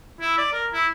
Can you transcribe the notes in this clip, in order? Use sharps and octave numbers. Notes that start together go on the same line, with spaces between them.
E4
D5
A#4
E4